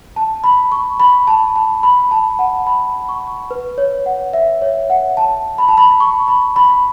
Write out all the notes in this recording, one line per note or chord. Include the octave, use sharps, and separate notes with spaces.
A5
B5
C#6
B5
A5
A5
B5
A5
F#5
B5
C#6
B4
C#5
F#5
E5
C#5
F#5
A5
B5
A5
B5
C#6
B5
B5